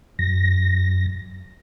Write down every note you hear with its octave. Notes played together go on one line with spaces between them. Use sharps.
F#2 A#6